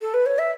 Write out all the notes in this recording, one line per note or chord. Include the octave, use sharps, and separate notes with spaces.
A4
B4
C#5
E5